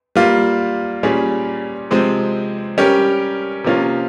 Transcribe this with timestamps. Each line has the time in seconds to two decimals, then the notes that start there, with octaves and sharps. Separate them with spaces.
0.16 G3 A#3 F4
1.03 A#2 G3 C#4 G#4
1.91 C3 F3 G#3 C4
2.78 G3 C#4 G4 A#4
3.64 C3 F3 A#3 C#4 F4